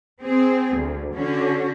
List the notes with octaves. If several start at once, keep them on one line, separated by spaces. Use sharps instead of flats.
C4 G#4
D2
D3 C#4 F#4